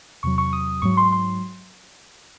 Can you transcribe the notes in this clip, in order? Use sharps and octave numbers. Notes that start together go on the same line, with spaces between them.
E2 C3 F#3 C#6
C#6
D#6
G#2 F#3 C#6
C6
C6